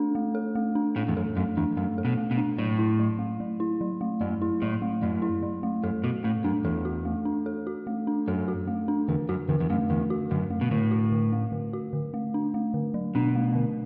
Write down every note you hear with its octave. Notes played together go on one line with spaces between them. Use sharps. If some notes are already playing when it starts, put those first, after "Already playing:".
Already playing: A3 D4 A4
A3
A4
A3
D4
A2 A3
E2
F#2 A4
F#2 A3
E2 D4
F#2 A3
A4
B2
A3
B2
D4
A2 F#3
E4
F#3
A3
F#3
E4
F#3
A3
F#2 F#3
E4
A2 F#3
A3
F#2 F#3
E4
F#3
A3
F#2 A4
B2 F#4
A2 A3
F#2 D4
E2 A4
F#4
A3
D4
A4
F#4
A3
D4
F#2 A4
F#4
A3
D4
E2 D3
F#2 F#4
E2 D3
E2
F#2 A3
E2 D3
F#4
F#2 D3
A3
B2
A2 D3
F#4
D3
A3
D3
F#4
D3
A3
D4
A3
D3
F#3
B2 D4
A3
D3